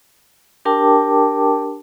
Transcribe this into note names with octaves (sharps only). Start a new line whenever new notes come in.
D4 G4 A#4 G5 A5 D6